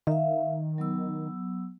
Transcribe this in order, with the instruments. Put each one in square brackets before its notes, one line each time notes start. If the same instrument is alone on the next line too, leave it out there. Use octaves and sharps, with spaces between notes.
[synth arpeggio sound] D#3 [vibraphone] E5 F5
[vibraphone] F#3 B3 E6